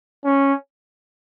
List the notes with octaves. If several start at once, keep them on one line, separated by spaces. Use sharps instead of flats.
C#4